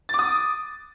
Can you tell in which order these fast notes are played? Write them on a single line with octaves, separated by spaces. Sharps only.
A6 D6 D#6